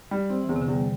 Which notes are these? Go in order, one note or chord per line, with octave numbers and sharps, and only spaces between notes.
G3
C4
E3
E2 D3
C3
D3
E2
G3